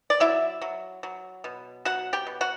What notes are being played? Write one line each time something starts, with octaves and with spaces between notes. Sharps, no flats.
D5
F#3 E4 E5
F#3
F#3
B2
F#3 F#4 F#5
G4 G5
B2
F#4 F#5